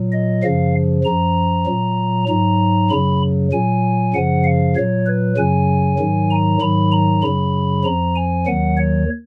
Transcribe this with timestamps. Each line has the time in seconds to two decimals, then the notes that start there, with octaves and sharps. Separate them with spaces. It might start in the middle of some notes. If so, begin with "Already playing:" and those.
Already playing: A#2 F#3
0.12 D#5
0.43 F#2 C#3 F3 F5
1.04 F#2 F3 A#5
1.66 A#2 F#3
2.28 G#2 F#3 A#5
2.90 F#2 C#3 F#3 B5
3.52 A#2 F#3 G#5
4.13 F#2 C#3 F3 F#5
4.44 F5
4.76 A#2 F#3 C#5
5.06 B4
5.37 F#2 C#3 F#3 G#5
5.99 G#2 D#3 F#3
6.31 A#5
6.61 G#2 D#3 F#3 B5
6.92 A#5
7.22 F#2 C#3 F#3 B5
7.84 F2 F3 A#5
8.15 G#5
8.46 D#2 D#3 F#3 F#5
8.77 C#5